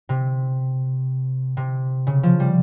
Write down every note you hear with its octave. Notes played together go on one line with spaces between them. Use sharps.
C3
C3
C#3
F3
G3